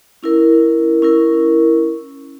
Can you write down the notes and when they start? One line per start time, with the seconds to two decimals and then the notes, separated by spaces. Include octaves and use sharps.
0.23 C#4 E4 A#4
1.02 C#4 E4 A#4